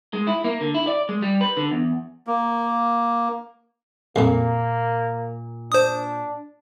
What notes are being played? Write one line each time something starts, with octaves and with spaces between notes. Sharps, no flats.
G#3
E4
A#3
D3
E4
D5
G#3
G3
B4
D3
E2
A#3
C2 F2 A#2 A#3 A#4
D4 C5 D#6